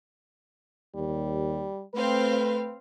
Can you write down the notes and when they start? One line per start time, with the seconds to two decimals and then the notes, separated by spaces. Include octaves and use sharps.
0.95 D#2 G3
1.95 A3 C4 B4 F5